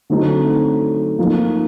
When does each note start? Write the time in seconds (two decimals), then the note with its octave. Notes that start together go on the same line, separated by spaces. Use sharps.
0.10 D3 F#3 A3 C4 D#4
1.19 F3 A#3 D#4